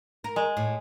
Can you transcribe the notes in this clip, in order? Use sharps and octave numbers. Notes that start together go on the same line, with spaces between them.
A#4
G#3
A2